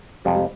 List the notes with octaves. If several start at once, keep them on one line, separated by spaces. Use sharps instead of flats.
F2 C3 F3 G3
G3